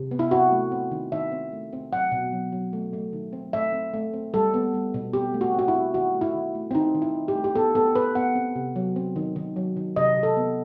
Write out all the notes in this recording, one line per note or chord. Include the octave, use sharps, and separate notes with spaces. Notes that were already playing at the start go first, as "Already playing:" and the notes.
Already playing: C3
B3
E4
C4 F#4
A3
C4
D#3
D#3 E5
C4
A3
C4
F#3 F#5
B2
F#3
F#3
A3
A3
D#3
C4
A3 E5
C4
A3
C4
G3 A4
B3
G3
B2
C4 G4
A3
F#4
C4 F#4
E4
C4
D#3 F#4
A3
E4
D#3
A3
C4
D#3 D#4
D#3
E4
D#3
G4
A3
G4
B3 A4
B3 A4
B3 B4
B3 F#5
C4
C3
F#3
C4
D#3
D#3
F#3
D#3
C3 D#5
C3
A4
B3